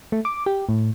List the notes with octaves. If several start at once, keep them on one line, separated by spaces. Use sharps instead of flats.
A3
D6
G4
A2